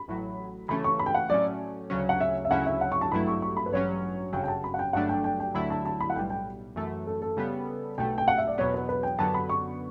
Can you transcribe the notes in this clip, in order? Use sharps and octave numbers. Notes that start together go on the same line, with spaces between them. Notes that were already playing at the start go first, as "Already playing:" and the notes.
Already playing: B5
A1 A2 F#3
C#3 E3 A3 C#4 B5
C#6
B5
G5
F#5
A2 F#3 A3 C#4 D5
D2 C#3 F#3 C#4
F#5
E5
E5
D2 C#3 F#3 C#4 E4 F#5
E5
F#5
C#6
A5
A1 G2 F#3 A3 E4 B5
C#6
C#6
B5
B4
A1 G2 F#3 C#4 C#5
G1 F#2 C#3 F#3 G5
G5
A5
B5
F#5
G5
G1 G2 F#3 A3 D4 F#5
G5
G5
G5
D2 D3 F#3 A3 E4 B5
A5
A5
B5
F#5
B1 A2 G3 G5
G5
F#2 E3 A3
A4
A4
C#3 G3 B3
B1 B2 A3 G5
G5
F#5
E5
D5
E2 B2 F#3 B3 C#5
B4
B4
G5
F#2 D3 F#3 B3 A5
B5
C#6